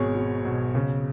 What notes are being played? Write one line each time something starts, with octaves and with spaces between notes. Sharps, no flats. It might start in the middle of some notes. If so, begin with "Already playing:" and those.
Already playing: G#1 B2 G#4 C#5
B2
B1
C#3